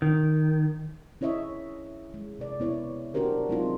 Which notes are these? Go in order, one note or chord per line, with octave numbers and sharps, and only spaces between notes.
D#3
C#4 E4 C#5 D#5 E5
G#3
C3 D5
B3 E4 C#5
D4 F#4 G4 A#4 C5
F#3 G#3 C4 D#4 F4